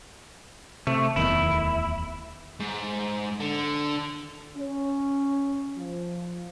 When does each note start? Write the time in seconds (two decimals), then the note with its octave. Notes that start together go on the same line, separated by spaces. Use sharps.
0.87 C3 A3
1.16 D1 E2 D#3 E4
2.60 G#2
3.40 D3
4.56 C#4
5.77 F3